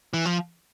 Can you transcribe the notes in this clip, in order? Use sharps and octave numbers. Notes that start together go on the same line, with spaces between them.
E3
F3